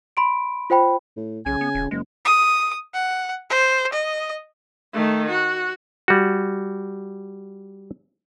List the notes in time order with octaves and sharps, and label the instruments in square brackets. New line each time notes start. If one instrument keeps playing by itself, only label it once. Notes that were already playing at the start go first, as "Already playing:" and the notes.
[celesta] B5 C6 D7
F4 C5 G5 B5
[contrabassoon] A2
[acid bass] B1 [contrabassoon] C#3 [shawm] G#5
[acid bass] B3
D#1
[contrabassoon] F#1 [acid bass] G#3
[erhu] D#6
F#5
C5
D#5
[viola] D#3 A3
F#4
[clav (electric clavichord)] G3 F#4